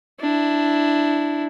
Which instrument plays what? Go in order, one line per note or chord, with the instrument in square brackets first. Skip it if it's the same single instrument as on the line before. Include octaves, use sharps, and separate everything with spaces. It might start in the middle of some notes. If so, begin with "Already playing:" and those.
[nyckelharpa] D4 E4